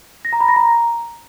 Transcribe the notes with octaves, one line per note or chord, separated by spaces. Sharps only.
A#6
A#5
B5
A#6
A#5